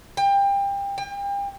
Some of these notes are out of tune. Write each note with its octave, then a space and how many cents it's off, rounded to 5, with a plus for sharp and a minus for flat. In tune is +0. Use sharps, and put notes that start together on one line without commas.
G5 +25
G5 +40